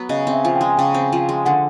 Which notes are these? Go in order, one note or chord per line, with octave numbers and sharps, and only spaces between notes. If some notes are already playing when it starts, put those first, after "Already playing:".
Already playing: F#3 B3
C#3 D#5
C4
E5
F3 G#5
G5
G#3
C#3 G5
C4
F3
G#3
D3 F#5